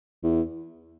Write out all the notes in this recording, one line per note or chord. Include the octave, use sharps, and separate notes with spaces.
E2